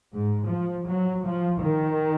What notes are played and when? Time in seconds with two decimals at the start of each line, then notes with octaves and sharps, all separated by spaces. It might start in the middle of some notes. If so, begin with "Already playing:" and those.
0.13 G#2
0.49 F3
0.87 F#3
1.24 F3
1.61 D#3